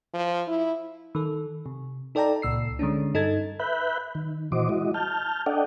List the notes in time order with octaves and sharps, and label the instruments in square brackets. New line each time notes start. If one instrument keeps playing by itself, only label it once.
[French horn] F3
E4
[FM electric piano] D#3 A4
C3
D#4 A4 D5 G5 A5 A#5
C#2 A#2 E6 C7
D3 G#3 C#4 D4
G2 D#4 A4 G#6 A6
[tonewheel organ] B4 E5 B5 F#6 G6
D#3
A#2 E3 F#4 C5 D#5 D6
G#3 E4 F#4 D#5
A5 F6 G6
D4 A4 D5 D#5 F#5 G5